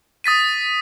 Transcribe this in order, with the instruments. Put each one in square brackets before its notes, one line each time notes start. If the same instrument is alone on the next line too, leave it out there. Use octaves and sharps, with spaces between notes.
[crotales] D#6 A6 B6 D#7